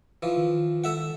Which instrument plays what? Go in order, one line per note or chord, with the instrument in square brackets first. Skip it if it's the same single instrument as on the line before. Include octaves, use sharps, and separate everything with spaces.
[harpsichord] E3 F3
[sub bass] D#3
[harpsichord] A4 E5 F#5